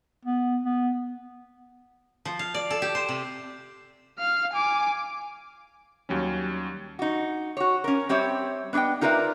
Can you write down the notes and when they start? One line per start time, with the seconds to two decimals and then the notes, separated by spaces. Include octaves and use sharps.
0.25 B3
0.63 B3
2.25 F3
2.39 F5
2.54 D5
2.70 A4
2.82 G4
2.95 C5
3.09 C3
4.18 F5 F6
4.53 G#5 D6
6.09 D#2 F#3 G3 C#4
6.99 D#4 F#4
7.57 F#4 C#5
7.84 C#4 A#4
8.09 G3 C4 G4 C#5 E5
8.73 B3 D4 C#5 D#5 G5
9.01 D#4 F4 A#4 B4 D5 E5